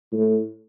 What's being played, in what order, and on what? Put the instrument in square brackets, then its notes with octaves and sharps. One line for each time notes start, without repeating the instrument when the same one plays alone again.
[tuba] A2